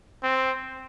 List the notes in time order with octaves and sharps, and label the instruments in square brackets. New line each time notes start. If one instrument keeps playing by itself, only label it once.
[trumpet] C4